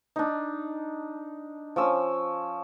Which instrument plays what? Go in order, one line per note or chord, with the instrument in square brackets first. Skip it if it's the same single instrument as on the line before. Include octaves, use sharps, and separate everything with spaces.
[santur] D4 D#4
F3 C#4 E6